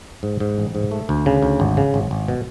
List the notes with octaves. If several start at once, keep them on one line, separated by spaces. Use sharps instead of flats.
G#2
G#2
A1
G#2
A3
D2
C#3
D2
G#1
C#3
G#1
G#1
B2